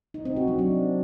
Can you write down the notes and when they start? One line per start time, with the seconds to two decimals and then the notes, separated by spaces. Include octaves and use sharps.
0.14 D#4
0.25 C4
0.36 F#4
0.48 F#3
0.59 D4